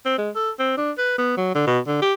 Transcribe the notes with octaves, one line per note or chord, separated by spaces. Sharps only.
C4
G#3
A4
C4
D4
B4
B3
F#3
D3
B2
D3
G4